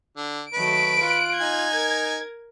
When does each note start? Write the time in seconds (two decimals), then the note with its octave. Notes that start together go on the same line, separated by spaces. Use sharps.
0.17 D3
0.53 D#3 F#3 A3 B4 D7
1.00 F4 F#6
1.41 D#4 G#5 G#6
1.74 A#4